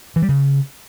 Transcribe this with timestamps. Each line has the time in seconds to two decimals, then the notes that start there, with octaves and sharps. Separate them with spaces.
0.16 E3
0.22 G3
0.29 C#3